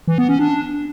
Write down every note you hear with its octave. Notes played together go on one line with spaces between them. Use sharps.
E3
B3
C#4
D4